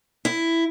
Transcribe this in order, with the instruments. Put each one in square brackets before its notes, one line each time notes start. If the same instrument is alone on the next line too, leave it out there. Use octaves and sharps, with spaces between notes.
[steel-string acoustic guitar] E4